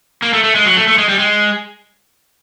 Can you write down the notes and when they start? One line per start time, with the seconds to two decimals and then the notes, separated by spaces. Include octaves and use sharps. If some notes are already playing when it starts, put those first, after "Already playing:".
0.22 A#3
0.33 A3
0.44 A3
0.55 G#3
0.66 F#3
0.76 A3
0.88 A3
0.98 G#3
1.09 G3
1.19 G#3